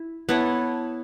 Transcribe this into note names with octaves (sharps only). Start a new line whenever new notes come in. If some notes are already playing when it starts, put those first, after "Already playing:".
Already playing: E4
B3 E4 A4 C#5